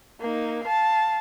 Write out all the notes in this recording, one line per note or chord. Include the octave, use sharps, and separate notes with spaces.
A#3 D#4
F5 A5